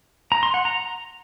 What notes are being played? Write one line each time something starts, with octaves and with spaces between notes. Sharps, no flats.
A#5
C6
F#5
A#5